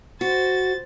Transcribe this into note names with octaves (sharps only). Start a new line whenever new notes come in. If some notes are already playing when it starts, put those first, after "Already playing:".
F#4 C5 A6